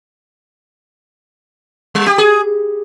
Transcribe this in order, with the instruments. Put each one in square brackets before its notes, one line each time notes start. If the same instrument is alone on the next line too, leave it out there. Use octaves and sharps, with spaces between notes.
[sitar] G3
G4
G#4